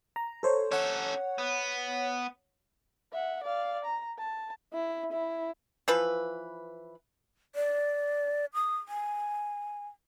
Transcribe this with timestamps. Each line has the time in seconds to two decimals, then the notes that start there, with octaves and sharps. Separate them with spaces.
0.16 A#5
0.43 A4 C5 C#5
0.71 C#4 A4 C#5 F#5
1.38 B3
3.12 E5 F#5
3.44 D5 F5
3.84 A#5
4.18 A5
4.73 E4
5.12 E4
5.88 E3 F3 B4
7.55 D5
8.54 D#6
8.88 G#5